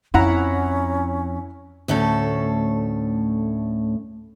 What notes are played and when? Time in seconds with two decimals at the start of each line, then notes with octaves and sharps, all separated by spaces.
0.14 F2 C#4 E4 F#5 A#5
1.88 D2 A2 C#4 A4